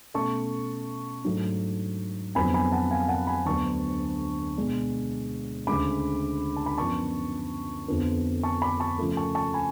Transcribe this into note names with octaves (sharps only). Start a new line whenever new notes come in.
B2 A3 C#4 A5 C#6
G#2 F#3 A3 D4
F2 D3 F#3 B3 G#5 B5
G#5 B5
F#5 A5
F5 G#5
F#5 A5
G#5 B5
D2 D3 F#3 B3 D4 A5 C#6
B2 G#3 D4
D2 C#3 G#3 C#4 B5 D6
A5
B5
F#2 F3 B3 D4 A5 C#6
F2 D3 F3 B3
A5 C#6
B5 D6
A5 C#6
C#3 F3 A3
A5 C#6
A5 C#6
G#5 B5